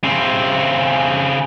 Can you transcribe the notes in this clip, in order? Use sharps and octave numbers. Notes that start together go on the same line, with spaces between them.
C#3 C4